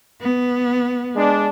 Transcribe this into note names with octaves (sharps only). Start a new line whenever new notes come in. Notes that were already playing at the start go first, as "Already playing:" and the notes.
B3
G#3 D4